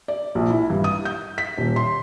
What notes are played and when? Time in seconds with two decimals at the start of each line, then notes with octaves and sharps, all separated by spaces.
0.08 D5
0.35 A#1
0.50 E4
0.70 G2
0.84 D#6
1.05 G6
1.38 B6
1.58 D#1
1.76 C6